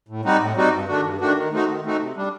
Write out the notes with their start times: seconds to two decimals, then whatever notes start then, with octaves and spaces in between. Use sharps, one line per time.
0.09 A2
0.25 G3 C4 D#4 F#4
0.40 A2
0.56 G3 C4 D#4 F#4
0.72 G2
0.88 D#3 A3 D4 F#4
1.04 G2
1.20 D#3 A3 D4 F#4
1.36 D#3
1.52 A3 C4 D#4 F#4
1.68 D#3
1.84 A3 C4 D#4 F#4
2.00 C3
2.16 G3 D4